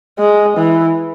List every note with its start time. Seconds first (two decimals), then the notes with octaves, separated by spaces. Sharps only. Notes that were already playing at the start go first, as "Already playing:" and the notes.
0.19 G#3
0.57 E3